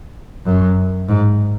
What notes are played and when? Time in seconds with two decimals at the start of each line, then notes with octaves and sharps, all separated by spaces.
0.45 F#2
1.09 G#2